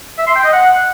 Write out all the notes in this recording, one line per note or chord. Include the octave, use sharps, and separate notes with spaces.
E5
C6
G5
D#5
F#5